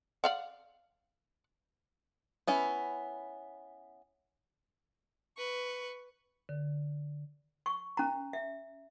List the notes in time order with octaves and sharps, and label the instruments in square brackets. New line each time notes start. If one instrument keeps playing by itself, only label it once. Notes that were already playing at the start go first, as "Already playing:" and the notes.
[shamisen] D5 F5 F#5
[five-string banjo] B3 C#4 E4
[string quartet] B4 C#6
[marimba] D3
[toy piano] C#6
C#4 A#5
E5